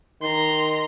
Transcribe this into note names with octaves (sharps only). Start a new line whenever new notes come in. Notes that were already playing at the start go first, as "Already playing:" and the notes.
D#3 A#5 C6